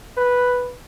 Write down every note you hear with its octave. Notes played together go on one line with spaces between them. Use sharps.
B4